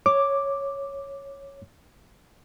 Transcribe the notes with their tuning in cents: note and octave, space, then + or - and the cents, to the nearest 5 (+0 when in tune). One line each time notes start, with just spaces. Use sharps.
C#5 +0 D6 +0